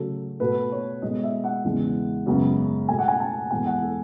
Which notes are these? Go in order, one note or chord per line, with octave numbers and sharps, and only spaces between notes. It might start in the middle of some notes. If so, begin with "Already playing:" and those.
Already playing: C#3 F#3 A3
B2 A3 B4
C#5
B2 G#3 B3 D#5
E5
F#5
E2 C#3 G#3 B3
F#2 C#3 G#3 B3
B2 A3 G#5
F#5
G#5
A5
E2 B2 G#3 B3 G#5
F#5
A4